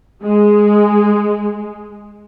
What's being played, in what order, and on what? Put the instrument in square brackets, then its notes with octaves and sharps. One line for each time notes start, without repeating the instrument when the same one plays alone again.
[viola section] G#3